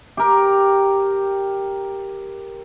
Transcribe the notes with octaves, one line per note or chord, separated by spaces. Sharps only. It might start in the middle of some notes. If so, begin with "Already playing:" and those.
G4 A#4